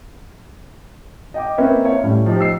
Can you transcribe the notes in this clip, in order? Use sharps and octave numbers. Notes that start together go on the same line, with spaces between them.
D#5 G5 D6
A#3 C4 C#4 B4 D#5 E5
C#5 E5 F5
A2 G3 C#4
F3 D#4 G4
E6 C7